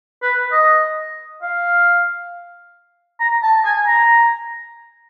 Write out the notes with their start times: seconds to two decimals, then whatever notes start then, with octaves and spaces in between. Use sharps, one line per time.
0.23 B4
0.52 D#5
1.42 F5
3.20 A#5
3.43 A5
3.65 G#5
3.87 A#5